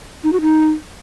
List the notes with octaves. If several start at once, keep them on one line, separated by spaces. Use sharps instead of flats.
D#4
F#4
D#4